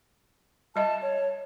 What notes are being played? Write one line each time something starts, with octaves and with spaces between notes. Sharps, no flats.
G3 D#5 E5 A5
C#5